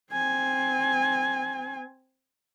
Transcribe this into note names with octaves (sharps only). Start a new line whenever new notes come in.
C4 G#5